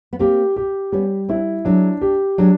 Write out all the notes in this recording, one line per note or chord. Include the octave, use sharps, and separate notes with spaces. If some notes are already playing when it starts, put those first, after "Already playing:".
B3
A#3 C4 G4
G4
G3 B3 C#4
C4 D4 E4
F#3 G#3 D4
G4
F#3 G#3 D4